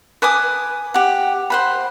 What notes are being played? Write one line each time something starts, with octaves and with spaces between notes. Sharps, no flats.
B4 G#5 D6 D#6
G4 F#5
C5 F#5 B5